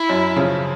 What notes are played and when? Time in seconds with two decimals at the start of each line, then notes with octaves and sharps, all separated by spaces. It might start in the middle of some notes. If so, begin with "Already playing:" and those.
Already playing: E4
0.09 F#2
0.36 C#3 F3